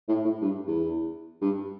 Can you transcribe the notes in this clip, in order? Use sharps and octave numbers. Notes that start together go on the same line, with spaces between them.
A2
A2
G2
E2
G2